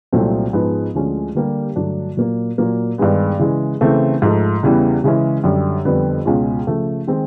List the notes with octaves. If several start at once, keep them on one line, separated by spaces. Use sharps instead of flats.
C2 A#2 F#3 A3 C4
G#2 F3 G#3 B3 D#4
D2 D3 F3 G#3 C#4
D3 G3 A#3 D4 G4
G2 D3 F#3 A3 D4
A#2 F#3 A#3
A#2 F#3 A#3
G2 D#3 G#3 B3
C#3 E3 G#3
C#3 E3 A3 C4
G#2 F3 A3
E2 C#3 E3 G3 B3
C#3 E3 G#3 C#4 E4
F#2 D3 G3
F2 D3 G3 B3
C#2 B2 G#3 C#4 F4
C#3 F3 A3
D#3 G#3 C4